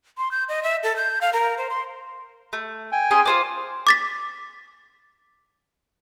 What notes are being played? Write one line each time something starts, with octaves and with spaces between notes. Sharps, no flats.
C6
G6
D#5
E5
A4
G6
F5
A#4
C5
C6
A3
G5 G#5
C#4 G#4 C6
F4 C5 D5
D6 A6 B6